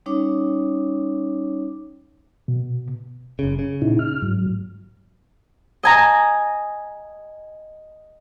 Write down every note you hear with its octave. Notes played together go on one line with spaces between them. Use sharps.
G3 C#4 D#4 C#5 D6
B2
F#1 C#3
C#3
A#2 D#4 E4
F6
G#2 F#3
D#5 G#5 A#5